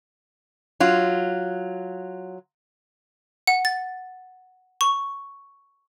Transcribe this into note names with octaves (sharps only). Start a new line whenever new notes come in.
F#3 F4
F#5
A6
C#6